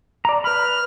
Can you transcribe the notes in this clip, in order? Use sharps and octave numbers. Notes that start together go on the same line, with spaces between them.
D5 A#5
B4 B5 F6